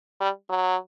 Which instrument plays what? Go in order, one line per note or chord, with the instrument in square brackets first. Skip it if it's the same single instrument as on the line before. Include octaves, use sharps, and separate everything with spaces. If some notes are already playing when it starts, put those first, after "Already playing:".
[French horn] G3
F#3